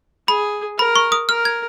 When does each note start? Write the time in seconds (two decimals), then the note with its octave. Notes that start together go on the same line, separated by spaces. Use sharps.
0.28 G#4 B5
0.78 A#4 B5
0.96 C#6
1.12 D#6
1.29 A#4 F6
1.45 G#6